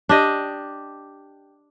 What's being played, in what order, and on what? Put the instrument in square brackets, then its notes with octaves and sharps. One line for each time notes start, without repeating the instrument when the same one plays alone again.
[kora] D4 G4 D#5